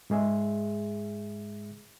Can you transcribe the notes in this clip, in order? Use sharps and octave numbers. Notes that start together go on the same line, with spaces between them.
G#2 G#3 G#4 E5